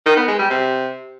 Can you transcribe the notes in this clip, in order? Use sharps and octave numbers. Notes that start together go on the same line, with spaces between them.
D#3
B3
G#3
G3
C3